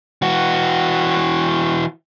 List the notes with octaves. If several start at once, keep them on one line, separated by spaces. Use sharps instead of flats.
E3 F#4